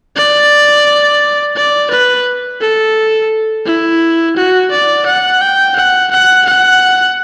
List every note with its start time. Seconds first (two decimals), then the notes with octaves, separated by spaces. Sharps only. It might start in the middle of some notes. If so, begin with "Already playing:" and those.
0.16 D5
1.56 D5
1.90 B4
2.61 A4
3.66 E4
4.36 F#4
4.71 D5
5.06 F#5
5.41 G5
5.76 F#5
6.11 F#5
6.45 F#5